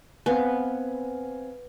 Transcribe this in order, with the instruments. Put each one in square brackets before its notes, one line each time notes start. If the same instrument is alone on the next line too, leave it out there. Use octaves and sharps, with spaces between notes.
[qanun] B3 [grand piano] C4 F5 G#5